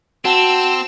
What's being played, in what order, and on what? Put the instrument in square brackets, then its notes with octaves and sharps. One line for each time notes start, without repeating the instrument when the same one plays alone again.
[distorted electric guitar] C4 [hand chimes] F#4 F#5 A5 [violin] E6 E7